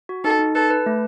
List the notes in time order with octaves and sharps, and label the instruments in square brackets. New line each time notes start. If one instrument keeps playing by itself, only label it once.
[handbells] F#4
[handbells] D#4 [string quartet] A4
[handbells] D#4
[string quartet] A4 [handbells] B4
[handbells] B4
A3